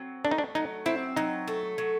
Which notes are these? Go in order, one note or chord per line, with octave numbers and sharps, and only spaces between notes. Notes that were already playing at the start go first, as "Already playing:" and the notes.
Already playing: F#3 C4
A3 D4
D#4
D4
F#3 D#4
C4 E4
F#3 D#4
A3
F#3